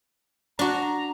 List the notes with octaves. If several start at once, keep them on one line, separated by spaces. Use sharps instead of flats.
D4 F#4 A#5